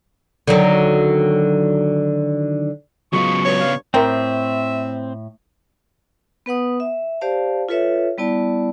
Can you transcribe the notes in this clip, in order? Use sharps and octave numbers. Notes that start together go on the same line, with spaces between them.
D3 D#3 F#3
C#3 F#3 G#3 B3 F4 C#6
G2 C#5
F5
A2 C4 A#4 C5 E5 G5
B3 B4 F#5 D#6
E5
G4 C5 D5 F5 A5
F4 A4 B4 C#5 E5
G3 B3 E4 D5 A5